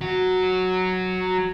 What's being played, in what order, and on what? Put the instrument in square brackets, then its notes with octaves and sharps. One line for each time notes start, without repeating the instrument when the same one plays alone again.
[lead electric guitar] F#3 F#4